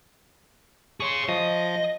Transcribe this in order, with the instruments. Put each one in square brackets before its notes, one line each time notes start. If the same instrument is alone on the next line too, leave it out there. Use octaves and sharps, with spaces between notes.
[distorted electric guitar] G#4 C#5 [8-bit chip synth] C6 C#6
[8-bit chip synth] F3 [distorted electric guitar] D#5